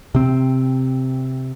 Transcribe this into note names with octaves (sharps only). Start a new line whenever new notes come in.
C3 C4